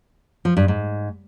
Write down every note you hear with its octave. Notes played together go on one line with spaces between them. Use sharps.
F3
G2
G#2